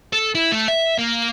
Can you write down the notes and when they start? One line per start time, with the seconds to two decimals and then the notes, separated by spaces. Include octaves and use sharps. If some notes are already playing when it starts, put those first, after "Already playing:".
0.13 A4
0.35 E4
0.52 A3
0.68 E5
0.98 A#3